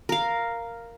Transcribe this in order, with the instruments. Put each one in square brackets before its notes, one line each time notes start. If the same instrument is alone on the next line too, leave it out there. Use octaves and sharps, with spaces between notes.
[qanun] A#4 F5